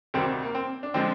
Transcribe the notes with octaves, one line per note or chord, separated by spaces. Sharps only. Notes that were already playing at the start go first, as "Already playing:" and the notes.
D2 C3 D#3 G3 C4
A#3
C4
D4
D3 F3 G#3 C4